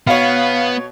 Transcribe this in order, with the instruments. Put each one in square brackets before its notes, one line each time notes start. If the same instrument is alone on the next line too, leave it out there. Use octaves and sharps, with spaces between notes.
[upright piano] B2 C#5 [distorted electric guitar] B3 [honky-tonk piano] F5